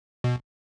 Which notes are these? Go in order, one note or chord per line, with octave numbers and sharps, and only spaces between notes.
B2